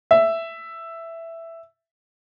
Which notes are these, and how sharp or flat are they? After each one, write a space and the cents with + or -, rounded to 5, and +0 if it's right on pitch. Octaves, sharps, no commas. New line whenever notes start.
E5 +5